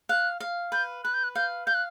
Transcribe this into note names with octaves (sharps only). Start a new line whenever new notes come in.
F5 F#6
F5
B4 G6
B4 F#6
G6
F#6
F5 G6
F5 G6
F#6